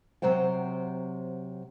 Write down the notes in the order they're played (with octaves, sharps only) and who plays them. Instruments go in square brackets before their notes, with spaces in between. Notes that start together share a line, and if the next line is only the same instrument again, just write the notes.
[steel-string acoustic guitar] C3 F#3 C5 F#5 G5